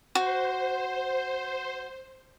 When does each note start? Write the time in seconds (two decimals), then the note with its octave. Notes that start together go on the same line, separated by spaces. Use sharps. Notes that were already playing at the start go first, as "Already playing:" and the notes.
0.15 F#4 C5